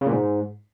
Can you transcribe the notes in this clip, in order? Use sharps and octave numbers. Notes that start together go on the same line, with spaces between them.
C#3
A#2
G#2